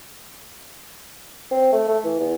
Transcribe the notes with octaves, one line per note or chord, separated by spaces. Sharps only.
C4
A3
A3
E3
E2